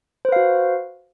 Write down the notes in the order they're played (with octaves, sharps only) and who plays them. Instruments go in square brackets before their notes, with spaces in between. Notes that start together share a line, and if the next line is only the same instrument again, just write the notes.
[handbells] C5
B4
F5
F#4